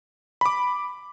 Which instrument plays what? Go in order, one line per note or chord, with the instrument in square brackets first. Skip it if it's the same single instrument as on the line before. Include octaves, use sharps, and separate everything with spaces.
[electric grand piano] B5 D6